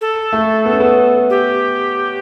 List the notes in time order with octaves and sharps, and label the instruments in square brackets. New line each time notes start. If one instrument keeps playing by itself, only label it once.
[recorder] A4
[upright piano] A3
B3
C#4
B3
[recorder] G4